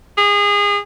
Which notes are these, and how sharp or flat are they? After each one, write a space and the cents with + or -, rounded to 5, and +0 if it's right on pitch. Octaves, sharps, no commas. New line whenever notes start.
G#4 -25